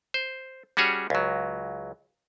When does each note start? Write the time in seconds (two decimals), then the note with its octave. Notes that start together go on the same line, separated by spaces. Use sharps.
0.14 C5
0.77 G3 C#4 F#4 G#4 C#5
1.10 C#2 F#3